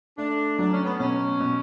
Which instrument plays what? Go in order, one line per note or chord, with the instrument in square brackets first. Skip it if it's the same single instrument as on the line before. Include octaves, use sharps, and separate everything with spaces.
[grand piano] A3 [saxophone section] D4
[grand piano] F#3 [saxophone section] D4
[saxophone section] C#4
B3
[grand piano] B2 [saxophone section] C#4
[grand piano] B2